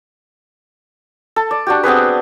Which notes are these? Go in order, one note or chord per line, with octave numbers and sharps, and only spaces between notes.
A4
D5
D4 F#4 G4
B3 C4 G#4 B4